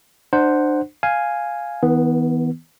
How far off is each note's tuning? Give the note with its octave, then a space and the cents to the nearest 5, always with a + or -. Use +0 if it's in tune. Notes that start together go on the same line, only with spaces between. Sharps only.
D4 +35 C5 +0 F#5 +0
F5 +0 G#5 +0
E3 -45 B3 +0